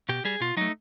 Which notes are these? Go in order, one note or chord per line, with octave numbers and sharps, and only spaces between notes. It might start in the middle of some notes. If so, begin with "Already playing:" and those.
B2 G4
G3 G#4
B2 F4
F#3 A3 D#4